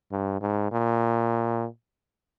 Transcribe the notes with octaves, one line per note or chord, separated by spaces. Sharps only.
G2
G#2
A#2